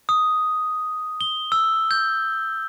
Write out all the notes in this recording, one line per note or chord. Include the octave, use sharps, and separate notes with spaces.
D#6
G7
E6
G6